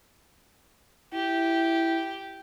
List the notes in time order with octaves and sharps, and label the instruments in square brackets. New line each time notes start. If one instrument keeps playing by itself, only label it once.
[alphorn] E4 [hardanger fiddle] G4